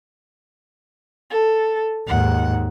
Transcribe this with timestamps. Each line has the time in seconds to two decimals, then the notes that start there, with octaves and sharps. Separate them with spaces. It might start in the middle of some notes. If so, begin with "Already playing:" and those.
1.31 A4
2.08 D#2 G#2 F#5